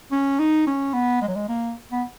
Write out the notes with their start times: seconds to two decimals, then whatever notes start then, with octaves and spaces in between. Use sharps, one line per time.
0.12 C#4
0.39 D#4
0.67 C#4
0.94 B3
1.22 G#3
1.28 F#3
1.36 G#3
1.49 A#3
1.92 B3